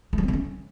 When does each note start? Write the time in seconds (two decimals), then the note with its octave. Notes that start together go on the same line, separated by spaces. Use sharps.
0.13 A3
0.18 F#3
0.23 C4
0.28 D3
0.33 C#4